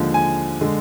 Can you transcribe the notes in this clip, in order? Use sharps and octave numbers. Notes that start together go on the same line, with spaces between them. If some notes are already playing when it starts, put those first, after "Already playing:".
Already playing: D#2 D3 F3 G#3
G#5
D3 G#3